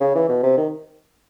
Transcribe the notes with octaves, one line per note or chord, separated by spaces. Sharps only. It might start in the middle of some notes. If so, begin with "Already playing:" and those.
C#3
E3
B2
C3
D#3